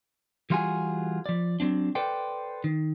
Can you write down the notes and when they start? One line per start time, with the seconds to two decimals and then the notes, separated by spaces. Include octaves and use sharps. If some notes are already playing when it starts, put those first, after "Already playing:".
0.50 E3 G3 F4 F#4 G#4 G#5
1.26 F3 D5
1.60 F#3 G#3 C4 D4
1.95 A4 B4 C5 D5 G5
2.64 D#3